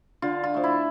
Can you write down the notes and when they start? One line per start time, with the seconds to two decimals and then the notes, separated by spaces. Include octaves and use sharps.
0.22 D3 F4
0.44 F4
0.54 F3 A3
0.64 E4